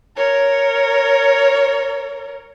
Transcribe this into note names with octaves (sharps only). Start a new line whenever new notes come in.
A#4 C#5